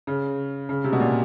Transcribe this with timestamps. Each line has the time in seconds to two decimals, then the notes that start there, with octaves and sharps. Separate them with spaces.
0.07 C#3
0.69 C#3
0.84 C3
0.92 B2
1.00 A#2